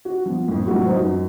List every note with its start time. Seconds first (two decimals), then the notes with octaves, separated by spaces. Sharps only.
0.05 F#4
0.26 F3 B3
0.48 F2 A2
0.67 A2 C3 F#3 A3 F#4
0.86 F#3 D#4 B4 C5
0.99 F#2